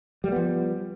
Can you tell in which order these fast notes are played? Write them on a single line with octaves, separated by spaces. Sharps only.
G3 A3 B3 F3